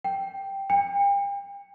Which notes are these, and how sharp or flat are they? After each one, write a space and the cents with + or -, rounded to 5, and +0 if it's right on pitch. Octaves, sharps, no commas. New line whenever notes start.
G5 -5
G5 +40